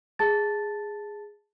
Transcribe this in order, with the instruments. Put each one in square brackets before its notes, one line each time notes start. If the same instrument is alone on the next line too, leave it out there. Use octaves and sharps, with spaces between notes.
[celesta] G#4 A5 A6